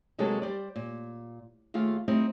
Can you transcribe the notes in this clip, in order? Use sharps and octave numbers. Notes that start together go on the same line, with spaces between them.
C3 F#3 G#3 A#3 G4 A4
G3 C5 D5
A#2
D#2 A3 F4 G#4 F5
G3 A3 C4 D#4 E4